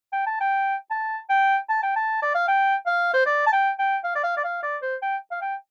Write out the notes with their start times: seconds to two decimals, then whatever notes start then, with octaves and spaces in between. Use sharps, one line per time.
0.13 G5
0.27 A5
0.40 G5
0.91 A5
1.30 G5
1.69 A5
1.83 G5
1.96 A5
2.22 D5
2.35 F5
2.48 G5
2.86 F5
3.14 C5
3.26 D5
3.46 A5
3.53 G5
3.79 G5
4.04 F5
4.15 D5
4.24 F5
4.37 D5
4.44 F5
4.63 D5
4.82 C5
5.03 G5
5.31 F5
5.42 G5